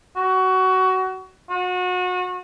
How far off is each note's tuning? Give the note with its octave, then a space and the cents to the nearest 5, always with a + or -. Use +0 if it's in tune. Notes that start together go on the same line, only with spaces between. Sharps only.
F#4 +20
F#4 -30